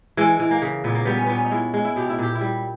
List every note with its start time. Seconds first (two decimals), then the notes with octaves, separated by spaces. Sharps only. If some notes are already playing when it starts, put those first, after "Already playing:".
0.17 E3 G#3
0.40 E3
0.51 A#3
0.62 C#3
0.84 A#2 B3
0.95 A#3
1.05 G3 B3
1.18 C#4
1.26 A#2 B3
1.35 C#4
1.44 D#4
1.51 G#3 E4
1.74 G#3
1.85 E4
1.96 B2 G4
2.10 E4
2.19 A#2 G4
2.35 E4
2.41 G3